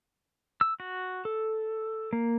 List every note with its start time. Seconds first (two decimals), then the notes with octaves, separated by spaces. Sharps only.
0.61 E6
0.80 F#4
1.25 A4
2.13 A#3